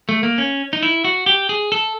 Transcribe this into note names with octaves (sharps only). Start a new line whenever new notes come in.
A3
A#3
C#4
D#4
E4
F#4
G4
G#4
A4